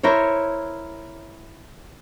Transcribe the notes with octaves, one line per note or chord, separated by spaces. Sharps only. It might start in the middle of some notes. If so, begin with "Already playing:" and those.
E4 A#4 C5 C#5